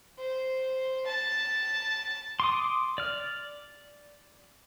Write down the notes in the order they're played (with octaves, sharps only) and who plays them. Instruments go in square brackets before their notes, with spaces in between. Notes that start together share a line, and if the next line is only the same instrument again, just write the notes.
[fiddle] C5
A5
[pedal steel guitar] C6 D6 D#6
D5 F6